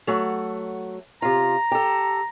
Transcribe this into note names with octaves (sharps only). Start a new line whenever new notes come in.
F#3 A3 F#5
C3 F4 A#5
G4 A4